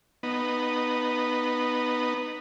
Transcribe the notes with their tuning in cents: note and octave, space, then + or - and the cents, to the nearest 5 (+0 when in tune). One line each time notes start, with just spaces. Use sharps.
B3 +0 D#4 -15